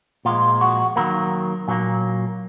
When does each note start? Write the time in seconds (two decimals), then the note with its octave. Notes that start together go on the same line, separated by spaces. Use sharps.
0.25 A#2 F3 G#3 F4
0.61 F#4
0.96 D#3 F#3 A#3 A#4
1.68 A#2 F#3 A#3